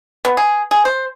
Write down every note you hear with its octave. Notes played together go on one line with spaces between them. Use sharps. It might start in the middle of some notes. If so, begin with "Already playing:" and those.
B3
G#4
G#4
C5